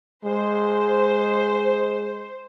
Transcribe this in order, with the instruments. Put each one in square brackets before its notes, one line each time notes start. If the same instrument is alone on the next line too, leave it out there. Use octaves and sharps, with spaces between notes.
[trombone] G#3 [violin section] C5